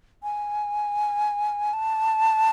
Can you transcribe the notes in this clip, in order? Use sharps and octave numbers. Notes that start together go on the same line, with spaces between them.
G#5
A5